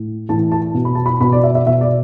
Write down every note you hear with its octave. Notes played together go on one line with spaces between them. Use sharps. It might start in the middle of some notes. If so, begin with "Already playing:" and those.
Already playing: A2
A2 E3 A5
A5
B2
B5
A5
B5
B2 B5
D5
E5
E5
B2 E5
D5